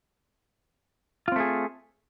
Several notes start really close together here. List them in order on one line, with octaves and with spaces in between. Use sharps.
F4 C4 A3 G#4